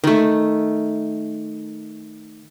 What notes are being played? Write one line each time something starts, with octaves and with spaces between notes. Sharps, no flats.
D#3 A3